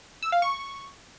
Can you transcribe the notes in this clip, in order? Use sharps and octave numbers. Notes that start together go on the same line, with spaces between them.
E6
F5
C#6